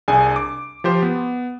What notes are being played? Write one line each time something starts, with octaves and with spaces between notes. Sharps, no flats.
C2 D4 G#4 G#5
D6
F3 G4 C5
B3